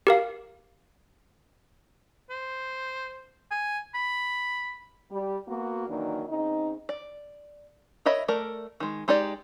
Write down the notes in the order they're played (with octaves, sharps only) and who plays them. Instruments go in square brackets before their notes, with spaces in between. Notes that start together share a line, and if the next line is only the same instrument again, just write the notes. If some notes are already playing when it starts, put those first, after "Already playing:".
[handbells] G4 A#4 F5
[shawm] C5
G#5
B5
[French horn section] G3
A#3 B3 F#4
D#3 E3 F#3 A#3 D4
C#3 C4 D#4
[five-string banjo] D5
A#4 C#5 D#5 E5 B5
A3 A#4 D5
D#3 G#3
G#3 D#4 G4 D5